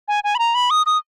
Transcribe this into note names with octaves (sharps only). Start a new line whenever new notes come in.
G#5
G#5
B5
A#5
B5
D#6
D#6